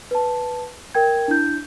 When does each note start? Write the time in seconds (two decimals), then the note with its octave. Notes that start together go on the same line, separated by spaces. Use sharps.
0.11 B4 A5
0.95 A#4 G5 G#6
1.28 D4 E4 G6